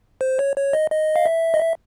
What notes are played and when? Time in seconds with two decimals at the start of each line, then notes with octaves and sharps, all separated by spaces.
0.21 C5
0.39 C#5
0.57 C#5
0.73 D#5
0.91 D#5
1.16 F5
1.26 E5
1.54 D#5
1.60 E5